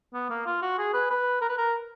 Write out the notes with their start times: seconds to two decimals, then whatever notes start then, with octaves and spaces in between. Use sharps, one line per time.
0.14 B3
0.30 A#3
0.46 F4
0.62 F#4
0.78 G#4
0.94 B4
1.10 B4
1.41 A#4
1.49 B4
1.58 A#4